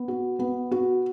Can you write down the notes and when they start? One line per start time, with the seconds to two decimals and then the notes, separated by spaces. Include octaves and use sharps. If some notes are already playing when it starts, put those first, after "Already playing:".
Already playing: B3
0.08 F#4
0.39 B3
0.71 F#4